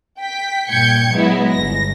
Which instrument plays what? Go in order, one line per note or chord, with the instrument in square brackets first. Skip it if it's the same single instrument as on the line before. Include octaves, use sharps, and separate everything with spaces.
[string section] G5 B6
G2 A#2 G5 G6 G#6 C#7
F#3 G#3 B3 E4
G1 A#6